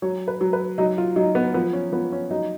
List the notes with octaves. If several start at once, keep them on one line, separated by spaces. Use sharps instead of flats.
F#3 C#5
B4
F#3
B4
F#3 D#4
F4
F#3 D#4
B3
F3 B3
C#4
F3 B3
C#4
F#3 D#4